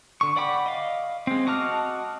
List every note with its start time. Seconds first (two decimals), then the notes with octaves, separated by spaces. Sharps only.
0.21 D3 C#6
0.37 D5 F#5 G5 B5 D6
0.66 D#5 F5
1.27 G#3 C4
1.47 F#4 D#5 A5 D6 F6